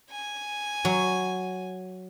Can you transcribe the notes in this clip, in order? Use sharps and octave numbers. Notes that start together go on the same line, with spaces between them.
G#5
F#3